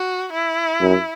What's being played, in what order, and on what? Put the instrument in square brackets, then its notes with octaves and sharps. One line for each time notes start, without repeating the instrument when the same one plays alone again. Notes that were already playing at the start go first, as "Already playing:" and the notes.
Already playing: [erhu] F#4
E4
[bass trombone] F#2